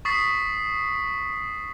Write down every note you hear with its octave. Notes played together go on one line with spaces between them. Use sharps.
C#6 D#6 A6 B6 C7